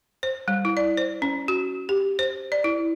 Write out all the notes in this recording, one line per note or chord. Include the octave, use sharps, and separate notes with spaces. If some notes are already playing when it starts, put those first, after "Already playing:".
C5
G3
E4
D5
C5
C#4
F#4
G4
C5
D5
E4